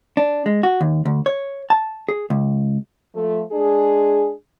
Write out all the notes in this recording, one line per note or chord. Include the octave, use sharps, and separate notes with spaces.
D4
G#3
F#4
D#2
D2
C#5
A5
G#4
C#2
F3 A3
G#3 D4 G#4